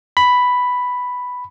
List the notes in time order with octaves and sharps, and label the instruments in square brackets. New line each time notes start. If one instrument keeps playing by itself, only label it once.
[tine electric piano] B5